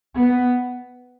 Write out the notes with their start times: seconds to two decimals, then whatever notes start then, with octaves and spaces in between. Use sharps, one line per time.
0.16 B3